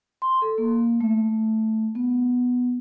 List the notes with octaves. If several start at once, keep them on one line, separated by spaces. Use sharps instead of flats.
C6
A4
A#3
A3
B3